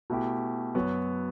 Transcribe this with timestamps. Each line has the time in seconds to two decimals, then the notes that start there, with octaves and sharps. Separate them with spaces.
0.10 B2 A3 E4 G4
0.75 F#2 F#3 B3 F#4